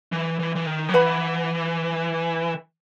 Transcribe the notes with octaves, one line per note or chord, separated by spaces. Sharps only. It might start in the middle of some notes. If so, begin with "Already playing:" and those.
E3
E3
E3
D#3
F#3
E3 B4 F#5 B5